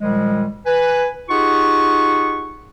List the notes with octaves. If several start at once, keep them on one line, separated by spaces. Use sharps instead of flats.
A#2 D#3 F3 G3 G#3
B4 G#5
D#4 F4 G4 G#4 F#5 C#6